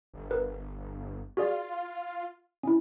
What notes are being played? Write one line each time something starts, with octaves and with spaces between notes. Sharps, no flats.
G1
A#4 B4
F4 F#4 G#4 D5
C#4 E4